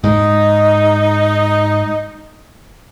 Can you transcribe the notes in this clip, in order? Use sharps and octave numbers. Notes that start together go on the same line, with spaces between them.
G#2 G#3 D#4